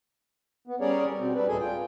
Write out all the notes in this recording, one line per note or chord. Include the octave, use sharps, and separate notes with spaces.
B3
G3 C#4 G#4 A#4 C#5 D5
B2 C4
G3 D4 B4
D2 A2 G#3 G#4 A4 G#5
F4 G5